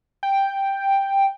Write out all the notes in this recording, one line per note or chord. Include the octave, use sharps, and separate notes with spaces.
G5